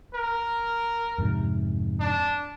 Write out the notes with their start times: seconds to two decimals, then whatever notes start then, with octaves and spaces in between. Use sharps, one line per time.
0.14 A#4
1.18 F2 G#2 C3
2.00 D4